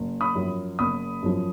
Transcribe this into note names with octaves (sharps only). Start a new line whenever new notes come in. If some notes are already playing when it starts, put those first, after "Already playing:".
Already playing: F#1
B5 D#6
F#2 F3
F#1 B5 D#6
F#2 F3